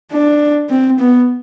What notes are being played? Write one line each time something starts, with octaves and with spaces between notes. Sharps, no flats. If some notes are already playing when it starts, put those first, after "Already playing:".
D4
C4
B3